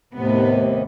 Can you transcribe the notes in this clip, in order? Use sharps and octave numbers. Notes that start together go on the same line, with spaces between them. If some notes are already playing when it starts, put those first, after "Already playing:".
D#2 A2 C3 B3